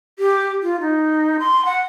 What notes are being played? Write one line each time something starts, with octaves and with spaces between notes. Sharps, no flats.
G4
F4
D#4
C6
F#5